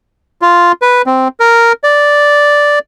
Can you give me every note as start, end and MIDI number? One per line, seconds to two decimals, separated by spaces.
0.42 0.72 65
0.82 1.02 71
1.06 1.28 60
1.40 1.73 70
1.84 2.79 74